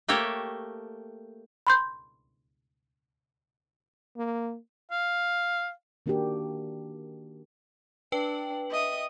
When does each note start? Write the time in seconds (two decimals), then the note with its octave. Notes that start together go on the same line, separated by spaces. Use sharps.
0.08 A3 A#3 G4 A4 C#5
1.67 B5 C6 G6
4.17 A#3
4.91 F5
6.06 D#3 A#3 D4 F#4 G4 A#4
8.12 D4 B4 G5 F#7
8.70 D#5 E5 D#6